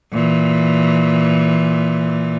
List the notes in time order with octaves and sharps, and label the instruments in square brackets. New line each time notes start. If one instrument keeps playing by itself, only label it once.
[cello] A#2 E3